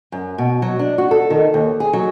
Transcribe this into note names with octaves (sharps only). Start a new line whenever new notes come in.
F#2
B2
F#3
D4
F#4
A4
D#3
D#2
G#4
F#3